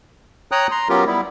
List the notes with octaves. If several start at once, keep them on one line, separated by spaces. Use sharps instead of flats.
C#5 G5 A#5 D#6 F#6
A#5 C6
F#3 B3 C#4 F4 G4 A#4
G3 B3 E4